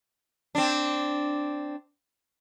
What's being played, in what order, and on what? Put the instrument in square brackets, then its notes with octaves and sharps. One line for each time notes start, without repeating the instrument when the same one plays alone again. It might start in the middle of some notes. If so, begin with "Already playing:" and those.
[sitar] C4 D4